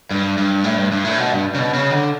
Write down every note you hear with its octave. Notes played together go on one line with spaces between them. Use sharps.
G2
G2
A2
G2
G2
A2
B2
G2
C#3
B2
C#3
D3